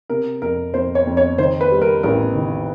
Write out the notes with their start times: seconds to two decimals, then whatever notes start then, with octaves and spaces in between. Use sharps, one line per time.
0.10 C3 A#4
0.42 F2 A#4
0.74 F2 C5
0.95 C#5
1.07 F2
1.17 C#5
1.38 D#3 C5
1.61 B4
1.71 G3
1.81 A#4
2.03 A1 A#4
2.35 D#3